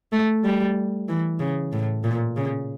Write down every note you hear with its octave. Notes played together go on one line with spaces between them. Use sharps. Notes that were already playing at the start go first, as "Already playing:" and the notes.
A3
G3
E3
C#3
A2
A#2
C#3